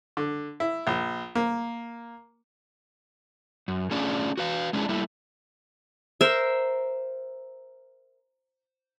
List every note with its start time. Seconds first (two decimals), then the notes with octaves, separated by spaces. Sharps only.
0.17 D3
0.60 E4
0.87 A#1
1.35 A#3
3.68 F#2
3.91 A3 C#4 D4 F4 G#4 D5
4.37 F#4 B4 F5
4.73 G#3 C#4 D4 E4 G#4
4.89 G3 A3 A#3 E4
6.21 A#4 C5 E5